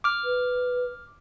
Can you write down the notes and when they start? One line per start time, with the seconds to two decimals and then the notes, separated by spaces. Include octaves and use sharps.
0.04 D6 F6
0.24 B4